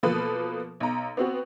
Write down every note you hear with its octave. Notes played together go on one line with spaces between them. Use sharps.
B2 F3 A#3 A4 B4
B1 A#5
B3 C4 F#4